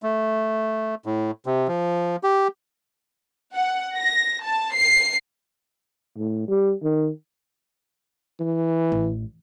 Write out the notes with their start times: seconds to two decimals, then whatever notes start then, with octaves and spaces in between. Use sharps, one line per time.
0.03 A3
1.06 A2
1.46 C3
1.68 F3
2.23 G4
3.54 F#5
3.96 A#6
4.44 A5
4.74 C7
6.17 A2
6.48 G3
6.83 D#3
8.40 E3
8.92 A1